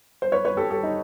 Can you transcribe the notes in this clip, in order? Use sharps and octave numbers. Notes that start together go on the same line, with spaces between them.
C5
B4 C#5
B4 C#5
G4 A4
G4 A4
D#4